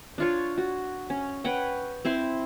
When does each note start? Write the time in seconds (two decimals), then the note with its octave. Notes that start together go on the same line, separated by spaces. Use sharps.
0.18 D4 F4 C#5
0.58 F#4
1.10 C#4
1.44 B4 C#5 F#5 G5
2.05 C4 E4 C5 C6